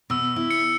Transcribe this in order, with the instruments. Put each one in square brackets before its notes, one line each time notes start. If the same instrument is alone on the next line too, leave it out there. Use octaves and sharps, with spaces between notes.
[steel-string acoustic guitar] B2 [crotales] E6
[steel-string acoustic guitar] E4
[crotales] C#7